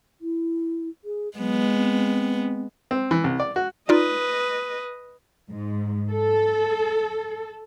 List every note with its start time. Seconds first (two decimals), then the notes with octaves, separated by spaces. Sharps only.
0.21 E4
1.04 G#4
1.38 F#3 G#3 B3
1.72 C4
2.91 C4
3.11 E3
3.24 C2
3.40 D5
3.56 F#4
3.89 D#4 F4 B4 D5 D#5
5.49 G#2
6.10 A4